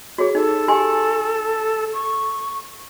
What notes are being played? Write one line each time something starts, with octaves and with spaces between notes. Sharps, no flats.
F#4 G#4 C#5
D#4 A4
G4 G#5 C6
C#6